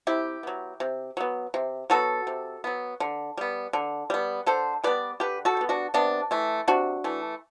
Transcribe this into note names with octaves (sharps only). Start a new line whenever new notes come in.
C3 E4 G4
F#3 B3
C3
F#3 B3
C3
F#3 B3 F#4 A4
C3
F#3 B3
D3
G3 B3
D3
G3 B3
D3 A4 C5
G3 B3 B4 D5
D3 G4 B4
F#4 A4
G3 B3
D4 F#4
C3 B3 D4
E3 A3
C3 D4 F#4
E3 A3